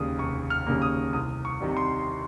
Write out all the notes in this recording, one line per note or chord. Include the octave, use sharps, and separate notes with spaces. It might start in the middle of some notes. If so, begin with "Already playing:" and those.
Already playing: F1 D#2 C#3 G3 A#3 D#6
F1 C#6
F6
D#2 C#3 G3 A#3
D#6
C2 D#6
C#6
C3 D#3 G3
C6